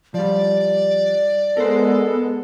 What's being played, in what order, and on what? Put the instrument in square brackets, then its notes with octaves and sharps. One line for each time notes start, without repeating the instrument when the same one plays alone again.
[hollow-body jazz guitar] F3 G3 [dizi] D5
[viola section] G#3 B3 [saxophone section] A4 [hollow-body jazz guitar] A#4 C5